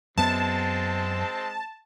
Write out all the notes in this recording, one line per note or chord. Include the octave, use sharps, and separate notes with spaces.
F#2 G#3 B3 C4 A5